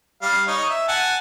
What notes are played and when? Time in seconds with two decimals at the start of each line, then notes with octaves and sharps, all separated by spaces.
0.22 G3 F5
0.48 D#4 C#5
0.70 E5
0.88 F#5 G#5 A5